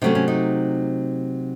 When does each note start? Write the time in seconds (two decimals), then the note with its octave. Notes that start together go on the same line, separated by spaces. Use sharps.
0.02 C3 F#3 A3 C#4 D#4
0.15 C#4
0.28 D#4